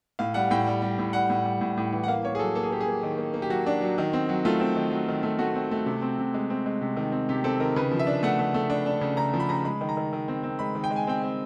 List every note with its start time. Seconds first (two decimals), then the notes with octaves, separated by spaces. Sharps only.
0.19 A2 F5
0.34 G3 F#5
0.51 A2 G5
0.67 G3
0.82 G3
0.99 A2
1.13 G3 F#5
1.30 A2
1.45 G3
1.61 A2
1.77 A2
1.92 E3
2.04 F#5
2.08 A#3 F5
2.25 A#3 C#5
2.35 G#4
2.39 F#3 A4
2.55 A#3 A4
2.63 G#4
2.71 A#3 G4
2.80 G#4
2.88 A#3
3.03 D#3
3.18 A#3
3.34 A#3
3.42 G4
3.50 F#3 F#4
3.66 D4
3.81 F#3
3.98 D#3
4.13 C4
4.29 F#3
4.45 A3 F4
4.60 C4
4.76 D#3
4.91 F#3
5.08 D#3
5.23 A3
5.39 A3 F#4
5.55 C4
5.71 A3
5.86 C3
6.02 C4
6.19 C3
6.34 G#3
6.50 C4
6.66 G#3
6.82 C3
6.97 D#3
7.12 C4
7.29 C3 G4
7.44 C4 A4
7.60 D#3 A#4
7.76 C#3 B4
7.91 F3
7.99 E5
8.07 D4
8.23 A3 F#5
8.39 A3
8.54 A3
8.70 D4
8.86 D4
9.01 C#3
9.17 C#3 A#5
9.34 F3
9.40 B5
9.49 C#3 A#5
9.65 G#3 B5
9.81 D#3
9.89 A#5
9.97 D#3
10.13 D#3
10.28 C4
10.43 C4
10.59 G#3 B5
10.75 D#3
10.84 G5
10.90 G#3
10.96 G#5
11.07 C4 G5
11.23 C4